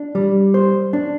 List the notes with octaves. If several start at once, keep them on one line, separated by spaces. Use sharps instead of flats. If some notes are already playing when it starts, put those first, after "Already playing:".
Already playing: D4
G3
C5
D4